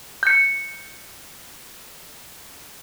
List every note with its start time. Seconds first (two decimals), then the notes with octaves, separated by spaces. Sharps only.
0.23 G6 C#7